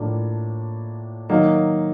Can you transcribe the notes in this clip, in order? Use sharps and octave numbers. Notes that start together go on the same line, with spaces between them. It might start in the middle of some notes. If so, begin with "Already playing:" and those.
Already playing: A2 F3 A#3 D4
D#3 F#3 A#3 D#4